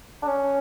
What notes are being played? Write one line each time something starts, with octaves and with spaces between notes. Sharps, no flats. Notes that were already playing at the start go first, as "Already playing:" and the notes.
D4
C#4